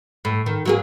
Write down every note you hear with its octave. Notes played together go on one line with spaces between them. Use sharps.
A2
D#3
F#3 A#3 G#4